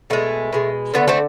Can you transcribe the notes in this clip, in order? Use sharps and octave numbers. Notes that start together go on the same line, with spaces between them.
B2 G#3 A3
B2 G#3
D3 A3 B3
A3 C4